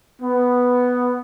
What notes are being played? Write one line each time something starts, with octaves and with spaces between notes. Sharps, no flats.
B3